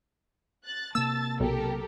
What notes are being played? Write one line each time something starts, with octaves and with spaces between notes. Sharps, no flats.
F#6 A6
C3 A#3 A5 E6 A6
B1 G4 A4 A#4